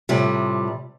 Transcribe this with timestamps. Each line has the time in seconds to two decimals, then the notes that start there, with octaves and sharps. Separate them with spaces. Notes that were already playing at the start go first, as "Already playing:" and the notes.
0.09 A2 C3 F3 G3